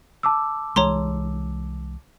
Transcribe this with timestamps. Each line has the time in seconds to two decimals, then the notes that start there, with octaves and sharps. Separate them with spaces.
0.23 A5 D6 E6
0.76 C2 E3 G#3 C#5 A#5 C6